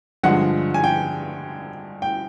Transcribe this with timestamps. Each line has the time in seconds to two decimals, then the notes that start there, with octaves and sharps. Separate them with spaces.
0.23 G2 D3 F3 G#3 F#5
0.74 G#5
0.84 G5
2.02 G5